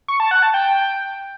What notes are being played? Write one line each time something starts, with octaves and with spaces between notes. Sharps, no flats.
C#6
A5
F#5
A5
G5